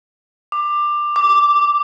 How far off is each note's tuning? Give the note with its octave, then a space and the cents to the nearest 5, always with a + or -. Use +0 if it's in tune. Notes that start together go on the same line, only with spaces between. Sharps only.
D6 +20
D6 -5